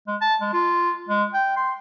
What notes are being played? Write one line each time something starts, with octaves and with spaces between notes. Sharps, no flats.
G#3
A5
G#3
F4
G#3
G5
C6